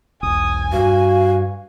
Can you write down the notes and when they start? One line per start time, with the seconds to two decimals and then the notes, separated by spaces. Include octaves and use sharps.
0.23 E1 B1 G#5 D#6
0.73 G2 F#4 F5